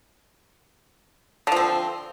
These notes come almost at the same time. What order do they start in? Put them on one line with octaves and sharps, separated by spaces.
D3 F3 C4